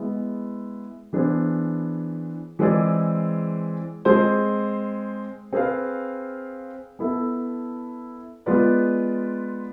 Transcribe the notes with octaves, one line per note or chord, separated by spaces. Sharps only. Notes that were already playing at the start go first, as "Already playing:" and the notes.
Already playing: G#3 B3 E4
E3 B3 D4 G#4 C5
E3 G#3 C4 G#4 D5
G#3 C4 G#4 C5
C4 G#4 B4 F5
B3 E4 A4
G#3 B3 F4 B4 D5